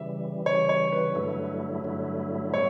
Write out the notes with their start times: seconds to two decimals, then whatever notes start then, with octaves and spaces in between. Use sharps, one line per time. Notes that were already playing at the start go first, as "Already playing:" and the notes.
Already playing: C#3 E3 G3 E5
0.46 C#3 E3 G3 C#5
0.69 C#5
0.92 B4
1.15 G2 D3 F#3 A3 E4
1.84 G2 D3 F#3 A3 E4
2.53 A2 G3 B3 C#5